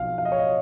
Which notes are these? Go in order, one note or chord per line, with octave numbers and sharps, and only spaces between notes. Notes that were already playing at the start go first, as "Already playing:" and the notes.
Already playing: B1 F3 F5
F5
D#5
C#5
D#5